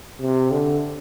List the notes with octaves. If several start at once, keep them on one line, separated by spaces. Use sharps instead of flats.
C3
D3